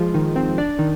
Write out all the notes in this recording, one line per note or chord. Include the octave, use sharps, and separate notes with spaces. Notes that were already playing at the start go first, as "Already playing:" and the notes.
Already playing: F3 G#3 F4 G#4
D#3 D#4
C4 C5
D4 D5
D#3 D#4